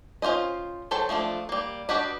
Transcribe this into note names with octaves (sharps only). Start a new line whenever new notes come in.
C#4 F4 F#4 C5 D#5
F#3 A4 C5 G5 A5
F3 A3 C4 D4 F4
G3 A#3
D4 F#4 G4 B4 D#5